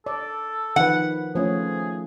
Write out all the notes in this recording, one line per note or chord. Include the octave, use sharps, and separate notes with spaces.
A4 D5
D#3 F3 B4 F#5
F3 A3 C#4 G#4